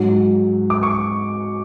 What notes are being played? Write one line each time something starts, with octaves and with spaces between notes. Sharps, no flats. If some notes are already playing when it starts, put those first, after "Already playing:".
Already playing: G#2 F#3
D6
C#6